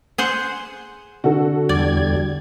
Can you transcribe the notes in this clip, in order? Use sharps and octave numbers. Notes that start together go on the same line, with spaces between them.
G#4 C5 F#5
D3 F#4 A4
E2 G3 D5 G#6